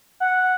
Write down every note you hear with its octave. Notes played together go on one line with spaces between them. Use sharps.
F#5